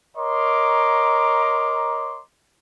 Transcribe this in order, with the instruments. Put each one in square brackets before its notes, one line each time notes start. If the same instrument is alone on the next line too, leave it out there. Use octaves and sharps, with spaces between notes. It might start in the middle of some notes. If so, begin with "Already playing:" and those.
[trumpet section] A#4 C#5 D#5 A#5 C6 D6